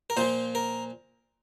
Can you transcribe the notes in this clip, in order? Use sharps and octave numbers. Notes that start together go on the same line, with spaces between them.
A#4
A#2 F3 C5
A#4